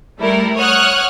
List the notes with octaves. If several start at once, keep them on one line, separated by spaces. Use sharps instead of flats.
G3 A3 E4 A#4
C#5 F#5 D#6 F6 F#6